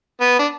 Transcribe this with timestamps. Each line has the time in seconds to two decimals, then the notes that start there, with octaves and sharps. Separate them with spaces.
0.21 B3
0.39 D4